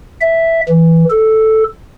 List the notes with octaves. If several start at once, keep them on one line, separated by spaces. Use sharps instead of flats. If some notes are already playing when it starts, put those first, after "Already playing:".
E5
E3
A4